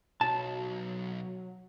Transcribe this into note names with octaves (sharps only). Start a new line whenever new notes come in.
B1 F#3 A5